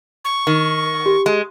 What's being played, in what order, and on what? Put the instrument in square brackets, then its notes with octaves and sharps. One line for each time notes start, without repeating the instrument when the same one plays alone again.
[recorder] C#6
[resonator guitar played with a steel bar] D#3
[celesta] G4
[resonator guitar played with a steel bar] G#3